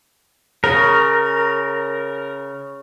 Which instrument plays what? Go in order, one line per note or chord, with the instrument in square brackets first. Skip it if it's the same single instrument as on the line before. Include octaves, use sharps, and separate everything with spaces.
[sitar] C#3 [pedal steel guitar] A#4